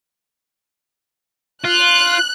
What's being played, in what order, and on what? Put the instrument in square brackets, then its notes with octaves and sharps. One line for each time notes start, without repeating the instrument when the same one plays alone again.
[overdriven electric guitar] F4 [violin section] F#6